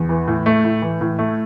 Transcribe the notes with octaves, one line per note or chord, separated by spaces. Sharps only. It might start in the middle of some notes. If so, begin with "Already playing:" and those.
Already playing: E2
E3
A2
A3
A2
E3
A2
A3